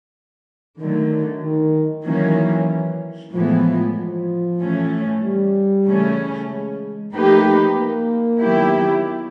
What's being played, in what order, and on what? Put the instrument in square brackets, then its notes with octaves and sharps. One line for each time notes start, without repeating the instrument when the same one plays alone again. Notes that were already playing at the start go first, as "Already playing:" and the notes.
[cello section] D3 F#3 A3 [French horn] D#3
[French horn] D#3
[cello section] D#3 F#3 A#3 C#4 [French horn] E3
[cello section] A2 E3 G#3 B3 [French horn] F3
[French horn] F3
[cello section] A2 E3 A3 C#4
[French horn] G3
[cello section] C#3 E3 A3 C#4
[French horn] G#3
[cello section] F3 A#3 D#4 G4 B4 [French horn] A3
[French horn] A#3
[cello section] D#3 F#3 B3 E4 G4